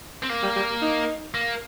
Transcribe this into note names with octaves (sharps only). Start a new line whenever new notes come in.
C4
A#3
G3
G3
D#4
A#3